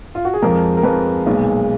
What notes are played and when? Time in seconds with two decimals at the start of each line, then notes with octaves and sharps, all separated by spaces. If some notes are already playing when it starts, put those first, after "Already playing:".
0.15 F4
0.25 F#4
0.34 G#4
0.42 F2 F3 G#3 A#4
0.77 A#4
0.83 F2 F3 G#3 B4
1.26 B1 A#2 G#3